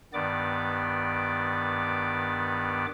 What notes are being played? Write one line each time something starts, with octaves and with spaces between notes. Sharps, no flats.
G2 D#3 B3 D5 D6